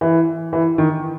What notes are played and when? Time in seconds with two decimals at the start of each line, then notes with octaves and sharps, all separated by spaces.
0.01 E3
0.53 E3
0.78 D#3